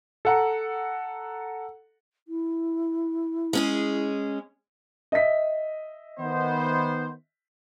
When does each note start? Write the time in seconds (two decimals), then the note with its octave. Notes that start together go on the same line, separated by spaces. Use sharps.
0.25 A4 F#5 A#5
2.28 E4
3.53 G#3 C#4 G#4
5.12 D#5 E5 B6
6.20 D#3 B3 C5